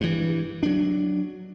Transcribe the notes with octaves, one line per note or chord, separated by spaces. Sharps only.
G2 E3
F#3 D4